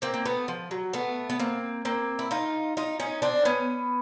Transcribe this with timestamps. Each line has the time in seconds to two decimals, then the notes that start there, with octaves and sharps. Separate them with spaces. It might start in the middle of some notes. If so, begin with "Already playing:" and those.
0.02 A#3 C4
0.14 A#3
0.25 A3 B3
0.48 F3
0.71 F#3
0.93 A3 B3
1.30 B3
1.39 A#3 C4
1.85 A#3 C4
2.19 E4
2.31 D#4 F4
2.77 D#4 F4
3.00 C#4 D#4
3.22 C4 D4
3.45 B3 C#4